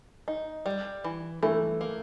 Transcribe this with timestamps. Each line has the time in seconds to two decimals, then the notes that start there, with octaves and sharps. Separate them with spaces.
0.28 D#4
0.66 G3
1.04 E3
1.43 E3 A3
1.81 A#3